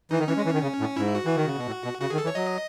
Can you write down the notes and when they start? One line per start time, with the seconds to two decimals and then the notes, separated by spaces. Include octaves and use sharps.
0.11 E3 D#4
0.19 D#3
0.28 E3 C#4
0.37 G#3
0.45 E3
0.54 D#3
0.62 C#3
0.80 A2
0.97 G#2 E4
1.15 F#4
1.26 E3
1.36 D#3
1.46 C#3
1.57 B2
1.66 A2
1.84 B2
2.01 C#3 F#4
2.10 D#3 G#4
2.18 A4
2.24 E3
2.27 C#5
2.35 F#3 D#5